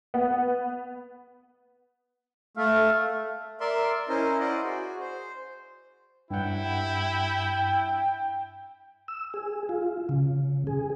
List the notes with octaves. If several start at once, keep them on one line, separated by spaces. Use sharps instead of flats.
B3
A3 F5
A#4 D5 E5 C6
C#4 E4 A#4 C5 D#5
C5 D5 D#5 F#5
F#4 G#4
C5
G2 E4 F#5 G5
E6
G#4
F4
C#3
G#4